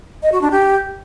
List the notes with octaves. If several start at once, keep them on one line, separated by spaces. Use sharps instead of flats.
D#5
F#4
D4
G4